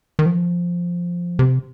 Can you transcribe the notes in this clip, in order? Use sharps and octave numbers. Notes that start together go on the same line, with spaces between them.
D#3
F3
C3